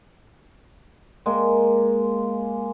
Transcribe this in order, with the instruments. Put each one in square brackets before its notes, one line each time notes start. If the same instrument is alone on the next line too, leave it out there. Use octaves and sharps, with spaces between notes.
[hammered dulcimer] G#3 A#3